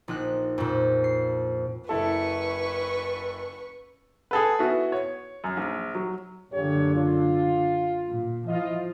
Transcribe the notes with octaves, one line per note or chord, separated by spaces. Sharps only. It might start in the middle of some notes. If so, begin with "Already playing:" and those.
A#1 D#4 F#6
F2 A#2
C7
F#1 E4 A4 B4 C#6
G#4 A4 B4
B3 E4 F#4
C#5
F#2
A#1
F#3
F#1 A#2 D3 G4 C#5
F4
A#2
F3 E4 F4 D#5